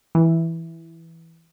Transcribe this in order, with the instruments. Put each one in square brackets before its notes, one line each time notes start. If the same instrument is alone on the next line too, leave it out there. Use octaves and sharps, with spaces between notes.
[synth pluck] E3